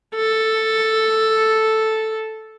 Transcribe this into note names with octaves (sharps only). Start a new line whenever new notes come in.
A4